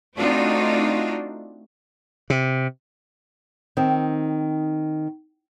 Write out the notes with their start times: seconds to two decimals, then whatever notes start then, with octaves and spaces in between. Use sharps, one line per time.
0.17 A3 C4 D4 D#4 F4 F#4
2.30 C3
3.77 D#3 C4